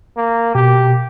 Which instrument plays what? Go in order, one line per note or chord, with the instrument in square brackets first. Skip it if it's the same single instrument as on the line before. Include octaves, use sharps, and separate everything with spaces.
[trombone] A#3
[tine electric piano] B2 [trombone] G4